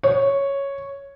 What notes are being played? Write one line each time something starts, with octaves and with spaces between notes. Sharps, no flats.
C#5